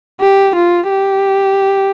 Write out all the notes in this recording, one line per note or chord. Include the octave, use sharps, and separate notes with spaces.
G4
F4
G4